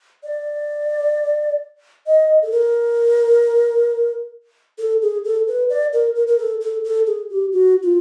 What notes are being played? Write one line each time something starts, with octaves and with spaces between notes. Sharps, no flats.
D5
D#5
A4
A#4
A4
G#4
A4
B4
D5
A#4
A#4
A#4
A4
A4
A4
G#4
G4
F#4
F4